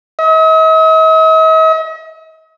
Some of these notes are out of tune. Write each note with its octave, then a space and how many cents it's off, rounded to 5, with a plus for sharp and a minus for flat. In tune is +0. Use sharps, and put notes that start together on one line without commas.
D#5 +45